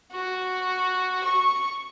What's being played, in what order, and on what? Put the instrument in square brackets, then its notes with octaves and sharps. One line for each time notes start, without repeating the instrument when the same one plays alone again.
[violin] F#4
C#6